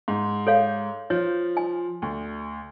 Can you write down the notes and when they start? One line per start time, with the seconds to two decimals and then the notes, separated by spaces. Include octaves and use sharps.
0.08 G#2 C6
0.47 A4 C#5 F5
1.10 F3 C#5
1.57 G#5
2.02 D2